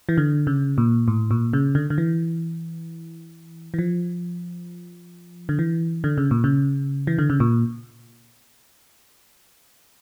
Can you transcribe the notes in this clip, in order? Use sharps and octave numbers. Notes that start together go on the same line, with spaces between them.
E3
D3
C#3
A#2
A2
A#2
C#3
D3
D3
E3
E3
F3
D3
E3
D3
C#3
A#2
C#3
E3
D3
C#3
A#2